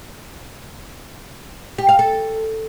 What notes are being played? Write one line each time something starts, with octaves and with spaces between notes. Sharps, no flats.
G4
F5
A4